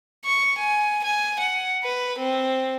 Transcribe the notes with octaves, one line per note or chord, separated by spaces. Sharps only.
C#6
G#5
G#5
F#5
B4
C4